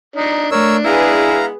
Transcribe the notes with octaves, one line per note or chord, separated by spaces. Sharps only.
D4 D#4
A3 D4 A#4 C#5 E6
G#3 B3 E4 G#4 B4 F5 A#5